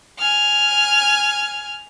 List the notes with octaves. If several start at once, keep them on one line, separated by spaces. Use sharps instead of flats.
G#5 F6